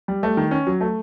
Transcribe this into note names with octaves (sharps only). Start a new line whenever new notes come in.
G3
A3
D#3
C#4
F#3
A3